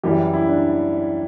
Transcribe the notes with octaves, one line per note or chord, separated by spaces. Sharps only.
F#2 C#3 E3 G3 G4
E4
D4